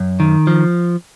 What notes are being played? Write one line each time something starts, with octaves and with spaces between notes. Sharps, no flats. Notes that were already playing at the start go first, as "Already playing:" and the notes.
Already playing: F#2
D#3
F3